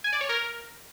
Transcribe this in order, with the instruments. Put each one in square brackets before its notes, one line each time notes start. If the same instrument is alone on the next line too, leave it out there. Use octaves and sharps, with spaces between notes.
[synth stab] G#5
D5
C#5
A#4